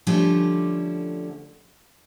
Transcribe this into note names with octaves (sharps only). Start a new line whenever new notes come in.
D3 F3 G3 A3 C#4